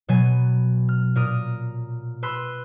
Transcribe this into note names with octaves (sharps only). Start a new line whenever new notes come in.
B2 F#3 B3 G#5
F6
A#2 A#4 D#6
B4 B5 C6 E6 F#6